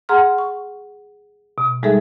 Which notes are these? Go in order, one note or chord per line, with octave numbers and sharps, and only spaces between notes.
G#4 F#5 A#5 C6 F6
C#6
B2
G3 G#3 D#4 G#4 A4 E5